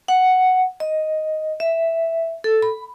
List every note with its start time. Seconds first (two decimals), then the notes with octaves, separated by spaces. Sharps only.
0.08 F#5
0.80 D#5
1.60 E5
2.44 A4
2.62 B5